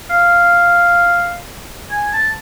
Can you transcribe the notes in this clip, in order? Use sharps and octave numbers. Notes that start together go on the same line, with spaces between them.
F5
G#5
A5